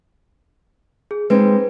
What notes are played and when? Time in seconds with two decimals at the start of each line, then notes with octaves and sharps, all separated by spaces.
1.11 G#4
1.30 G#3 C4 D#4 B4